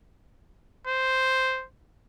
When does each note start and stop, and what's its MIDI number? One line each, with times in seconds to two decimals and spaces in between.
0.87 1.65 72